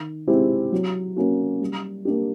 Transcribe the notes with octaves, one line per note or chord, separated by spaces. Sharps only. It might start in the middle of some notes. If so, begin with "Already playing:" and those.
Already playing: D#3
G#3 C4 E4 G4
F#3
A#3 C#4 F#4
G3
A#3 D4 G4